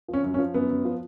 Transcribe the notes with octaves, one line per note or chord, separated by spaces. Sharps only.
F3 C#4
F#2
C#4
F3
F#2 B3
F#2
F3